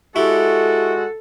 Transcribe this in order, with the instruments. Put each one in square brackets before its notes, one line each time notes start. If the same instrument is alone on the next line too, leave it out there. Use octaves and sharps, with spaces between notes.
[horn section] G#3 F#4 [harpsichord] E4 G4 [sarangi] A4